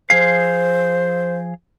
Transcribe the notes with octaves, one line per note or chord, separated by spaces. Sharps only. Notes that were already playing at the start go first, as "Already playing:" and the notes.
F3 G#4 C5 F5